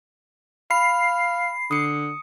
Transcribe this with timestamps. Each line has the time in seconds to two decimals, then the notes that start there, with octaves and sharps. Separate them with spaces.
0.71 F5 B5 C7
1.71 D3 D#6 C#7